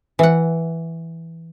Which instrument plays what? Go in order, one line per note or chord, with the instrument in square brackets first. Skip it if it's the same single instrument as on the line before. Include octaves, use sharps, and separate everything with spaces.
[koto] E3 F#5